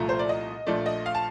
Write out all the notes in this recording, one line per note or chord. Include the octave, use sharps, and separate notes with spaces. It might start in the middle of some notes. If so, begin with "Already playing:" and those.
Already playing: C2 A#2 F3 A3 A#5
C5
D5
D#5
A#1 A#2 F3 A3 D5
D#5
F5
A5